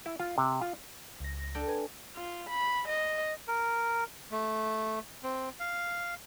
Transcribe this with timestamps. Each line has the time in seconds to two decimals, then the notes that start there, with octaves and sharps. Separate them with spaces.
0.06 E4
0.20 F4
0.38 C3
0.62 F4
1.20 C#2 A#6
1.55 D4 A4 G5
1.68 B4 G#5
2.16 F4
2.50 B5
2.88 D#5
3.48 A#4
4.31 A3
5.23 C4
5.60 F5